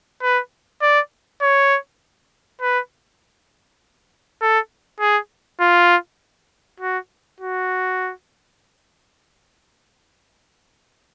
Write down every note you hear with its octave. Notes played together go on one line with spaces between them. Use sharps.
B4
D5
C#5
B4
A4
G#4
F4
F#4
F#4